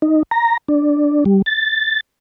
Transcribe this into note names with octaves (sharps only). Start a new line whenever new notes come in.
D#4
A#5
D4
G3
A6